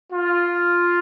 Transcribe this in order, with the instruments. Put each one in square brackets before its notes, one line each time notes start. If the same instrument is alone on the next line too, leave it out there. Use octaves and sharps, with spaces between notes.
[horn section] F4